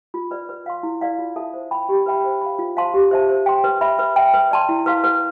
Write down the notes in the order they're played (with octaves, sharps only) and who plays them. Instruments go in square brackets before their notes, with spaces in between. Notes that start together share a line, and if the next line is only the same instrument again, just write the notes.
[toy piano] F4
B4 D5
B4
F5 C6
E4
B4 D5 F5
F4
A4 E5 A5
C5
G5 B5
G4
B4 E5 G5 B5
C5
F5 B5
F4
C5 F5 A5 C6
G4
C5 E5 A5
C5
G5 C6
B4
E5 B5
B4
E5 G5
B4
D5 A5 C6
E4
B4 F5 C6
B4